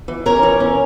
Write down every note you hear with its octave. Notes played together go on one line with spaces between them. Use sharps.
E3
C#4 A#4 C#5
E3
C#4